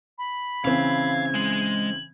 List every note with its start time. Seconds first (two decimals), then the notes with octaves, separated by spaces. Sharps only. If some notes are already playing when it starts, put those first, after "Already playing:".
0.18 B5
0.65 C#3 E3 C4 F5 G#6
1.34 G#3 F#7